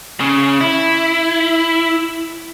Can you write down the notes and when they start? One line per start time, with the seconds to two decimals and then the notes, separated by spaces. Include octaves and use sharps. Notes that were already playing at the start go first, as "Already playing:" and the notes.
0.20 C#3
0.61 E4